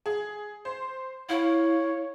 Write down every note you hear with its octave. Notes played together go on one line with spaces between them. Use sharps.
G#4
C5
E4 C#5 F5